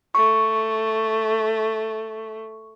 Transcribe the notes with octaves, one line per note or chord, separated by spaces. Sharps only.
A3 C#6